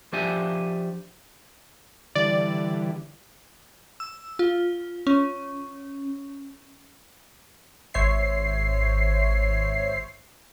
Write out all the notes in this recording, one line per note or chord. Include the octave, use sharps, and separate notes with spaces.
F3 D4 G4 D5 E5 G#5
D3 E3 G3 D5
E6
F4
C#4
G#1 C5 C#5 E5 C7